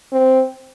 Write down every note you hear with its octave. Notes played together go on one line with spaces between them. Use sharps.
C4